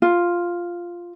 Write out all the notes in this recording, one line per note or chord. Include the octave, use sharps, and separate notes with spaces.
F4